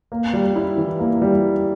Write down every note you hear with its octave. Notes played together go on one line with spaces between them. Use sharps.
A#3
G3
E4
E3
A#3
G3